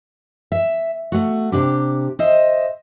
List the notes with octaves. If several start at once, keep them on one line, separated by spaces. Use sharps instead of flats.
E5
A3 F#4
C3 D4 G4
C5 D#5 E5